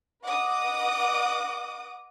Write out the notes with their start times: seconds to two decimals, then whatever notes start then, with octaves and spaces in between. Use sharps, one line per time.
0.23 B4 D#5 F#5 D6 D#6